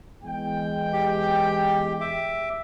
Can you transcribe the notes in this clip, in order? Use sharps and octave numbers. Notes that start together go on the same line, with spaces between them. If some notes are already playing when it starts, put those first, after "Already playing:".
E2 G#3 G5
G4
E5 D6